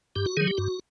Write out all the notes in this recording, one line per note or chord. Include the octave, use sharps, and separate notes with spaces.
G2 G4
F#4
D#3 F#3 G#4
G4
G2 F#4